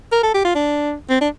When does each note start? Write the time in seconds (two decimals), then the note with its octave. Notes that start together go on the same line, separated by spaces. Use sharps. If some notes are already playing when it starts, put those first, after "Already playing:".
0.12 A#4
0.23 A4
0.35 G4
0.45 F4
0.55 D4
1.10 C4
1.21 D4